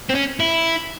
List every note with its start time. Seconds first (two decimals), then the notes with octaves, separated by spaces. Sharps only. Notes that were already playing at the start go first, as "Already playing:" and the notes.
0.10 C4
0.15 C#4
0.40 E4